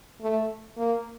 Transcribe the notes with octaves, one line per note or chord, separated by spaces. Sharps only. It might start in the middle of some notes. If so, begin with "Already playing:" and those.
A3
A#3